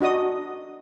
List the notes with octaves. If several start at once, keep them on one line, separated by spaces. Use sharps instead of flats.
D4 F#4 D#5 D#6